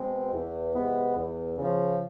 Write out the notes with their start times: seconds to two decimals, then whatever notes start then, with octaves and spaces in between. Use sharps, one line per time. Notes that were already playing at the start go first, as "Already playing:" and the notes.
Already playing: B2 G#3 C4
0.34 E2
0.74 C3 E3 G#3 B3
1.16 E2
1.57 C#3 F3